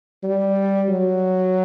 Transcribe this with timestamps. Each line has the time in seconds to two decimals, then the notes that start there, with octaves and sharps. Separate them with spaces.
0.23 G3
0.89 F#3